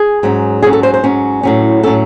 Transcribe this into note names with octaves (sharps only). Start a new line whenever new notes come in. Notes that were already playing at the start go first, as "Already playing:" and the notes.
Already playing: G#4
G#2 F#3 C#4
G#2 F#3 C#4 G#4
A4
C5
C5
G#2 F#3 C#4
A2 F#3 C#4
A2 F#3 C#4 A4